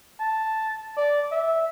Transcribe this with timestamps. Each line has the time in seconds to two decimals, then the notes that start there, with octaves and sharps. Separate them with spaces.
0.20 A5
0.97 D5
1.32 E5